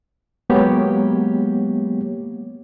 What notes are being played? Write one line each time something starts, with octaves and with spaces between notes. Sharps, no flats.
F#3 G#3 A#3 B3 G4 C#5